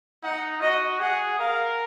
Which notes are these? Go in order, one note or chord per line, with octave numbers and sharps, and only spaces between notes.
D#4 F#5
F#4 D#5
G#4 F#5
A#4 F5